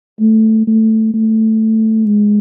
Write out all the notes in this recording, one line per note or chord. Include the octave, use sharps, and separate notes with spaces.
A3
A3
A3
G#3